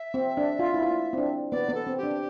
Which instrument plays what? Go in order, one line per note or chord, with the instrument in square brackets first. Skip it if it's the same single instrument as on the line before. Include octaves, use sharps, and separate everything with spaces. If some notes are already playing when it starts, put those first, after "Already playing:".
Already playing: [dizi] E5
[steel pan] C4
D4
F4
E4
F4
C4
D4
[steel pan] B3 [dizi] D5
[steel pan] B3
[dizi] A4
[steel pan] C4
[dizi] G4
[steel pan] D4